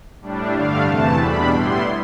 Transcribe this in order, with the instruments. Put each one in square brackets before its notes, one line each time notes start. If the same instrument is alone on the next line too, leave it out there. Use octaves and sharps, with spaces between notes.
[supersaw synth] A2 G3 D4
G2 D3 A3 D4 F5
E2 C3 E3 A3 A5
E2 B2 G3 D4 B5
A2 G3 B3 E4 C6